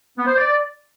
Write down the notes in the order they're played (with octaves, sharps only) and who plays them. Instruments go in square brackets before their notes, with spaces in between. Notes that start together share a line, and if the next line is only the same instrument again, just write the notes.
[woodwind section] B3
C5
D5